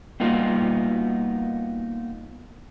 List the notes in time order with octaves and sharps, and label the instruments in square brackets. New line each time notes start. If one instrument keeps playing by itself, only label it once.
[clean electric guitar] G3 A#3 B3 D#4 F4 F#4